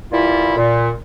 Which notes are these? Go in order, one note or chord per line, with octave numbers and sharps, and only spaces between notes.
E3 G3 A#3 E4 F4
A#2